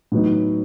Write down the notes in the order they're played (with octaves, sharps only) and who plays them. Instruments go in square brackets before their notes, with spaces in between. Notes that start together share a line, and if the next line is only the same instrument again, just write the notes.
[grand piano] A2 F#3 B3 D#4